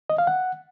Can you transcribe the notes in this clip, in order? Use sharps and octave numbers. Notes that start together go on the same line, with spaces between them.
D#5
F5
F#5